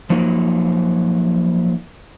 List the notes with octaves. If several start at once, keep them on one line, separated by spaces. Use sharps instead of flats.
F3 F#3 A#3 D#4